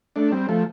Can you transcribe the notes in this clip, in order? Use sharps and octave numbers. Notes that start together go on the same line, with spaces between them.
A3 D4
G3 C4
F3 A3